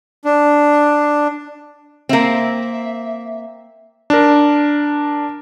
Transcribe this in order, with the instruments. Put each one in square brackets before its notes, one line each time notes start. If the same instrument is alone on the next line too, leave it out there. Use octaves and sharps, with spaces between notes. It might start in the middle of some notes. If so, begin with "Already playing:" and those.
[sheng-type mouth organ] D4
[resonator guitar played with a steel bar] A#3 C4 [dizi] E5
[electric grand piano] D4 A#4